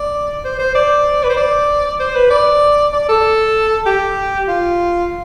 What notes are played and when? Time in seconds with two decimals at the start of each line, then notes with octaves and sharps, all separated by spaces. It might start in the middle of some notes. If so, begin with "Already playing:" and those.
Already playing: D5
0.45 C5
0.59 C5
0.75 D5
1.23 B4
1.30 C5
1.37 D5
2.00 C5
2.15 B4
2.30 D5
2.93 D5
3.09 A4
3.86 G4
4.48 F4